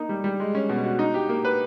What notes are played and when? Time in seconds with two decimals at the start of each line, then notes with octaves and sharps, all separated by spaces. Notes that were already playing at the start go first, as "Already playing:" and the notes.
Already playing: A#3 D#4
0.09 G3
0.24 G3
0.40 G#3
0.55 C#4
0.69 B2
0.84 F#4
0.99 D#4
1.14 G4
1.29 A#3
1.45 B4